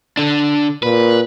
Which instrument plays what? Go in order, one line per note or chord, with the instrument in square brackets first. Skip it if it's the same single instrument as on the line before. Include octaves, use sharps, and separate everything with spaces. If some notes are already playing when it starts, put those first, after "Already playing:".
[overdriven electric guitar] D3 D4
[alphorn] A#2 [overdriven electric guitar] B4